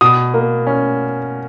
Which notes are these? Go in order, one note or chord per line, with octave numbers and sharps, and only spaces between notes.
B2 D#6
A#3
C#4